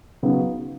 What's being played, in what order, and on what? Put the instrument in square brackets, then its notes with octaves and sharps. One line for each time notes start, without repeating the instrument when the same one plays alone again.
[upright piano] C#3 F#3 B3 D#4 F#4